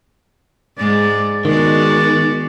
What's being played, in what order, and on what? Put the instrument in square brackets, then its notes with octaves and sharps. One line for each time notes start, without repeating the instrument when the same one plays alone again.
[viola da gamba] G#2 G#3 [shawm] D5
[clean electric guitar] D#3 [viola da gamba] G#3 B3 F#4 [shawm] D5